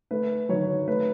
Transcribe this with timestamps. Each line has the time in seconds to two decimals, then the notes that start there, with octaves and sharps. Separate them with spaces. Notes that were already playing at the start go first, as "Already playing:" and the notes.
0.11 A3 B4
0.49 F#3 C#5
0.87 A3 B4